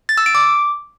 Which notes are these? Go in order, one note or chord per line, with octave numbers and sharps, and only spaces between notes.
A6
E6
D7
D6